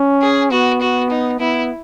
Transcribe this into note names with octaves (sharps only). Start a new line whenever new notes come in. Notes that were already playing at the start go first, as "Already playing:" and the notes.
Already playing: C#4
G#4
B3 F#4
F#4
D#4
B3 E4